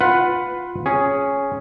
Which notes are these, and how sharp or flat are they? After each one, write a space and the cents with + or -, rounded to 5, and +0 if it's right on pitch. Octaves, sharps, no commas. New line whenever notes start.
F4 +15 B4 +10 F#5 +0
C#4 +0 G#4 +0